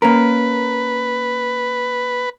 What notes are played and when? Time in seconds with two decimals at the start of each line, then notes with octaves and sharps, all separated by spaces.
0.02 A#3 C#4 A#4 B4